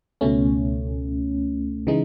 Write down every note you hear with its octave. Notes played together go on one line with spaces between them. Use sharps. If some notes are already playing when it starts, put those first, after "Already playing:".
C#2 B2 A3 C#4
C#3 E3 G#3 D#4